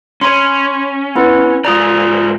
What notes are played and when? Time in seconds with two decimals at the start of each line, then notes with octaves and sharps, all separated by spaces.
0.21 C#4 C#5 B5 C6
1.15 B3 E4 B4
1.65 G#2 F4 D5 A#5 D#6